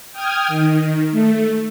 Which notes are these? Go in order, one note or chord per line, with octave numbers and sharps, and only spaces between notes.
G5 D#6 F6 G#6
D#3
A3